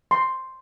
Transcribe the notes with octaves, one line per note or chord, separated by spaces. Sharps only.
C6